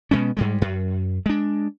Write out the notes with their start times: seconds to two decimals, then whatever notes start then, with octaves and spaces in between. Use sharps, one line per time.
0.11 B2 G#3 B3 C#4
0.37 G#2 G3 G#3
0.62 F#2
1.26 G#3 D4